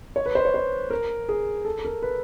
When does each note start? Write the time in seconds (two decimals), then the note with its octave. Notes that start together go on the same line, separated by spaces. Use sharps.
0.16 C#5
0.26 B4
0.35 C5
0.45 C#5
0.54 C5
0.90 A#4
1.29 G#4
1.65 A4
1.85 A#4
2.03 B4